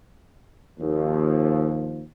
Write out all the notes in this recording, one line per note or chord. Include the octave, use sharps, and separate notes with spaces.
D#2 F3